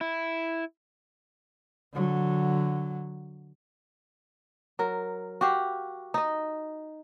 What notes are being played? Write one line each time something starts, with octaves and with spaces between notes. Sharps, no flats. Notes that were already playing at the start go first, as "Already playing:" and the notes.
E4
D3 F#3
F#3 A#4
F#4 G4 F5
D#4 D#5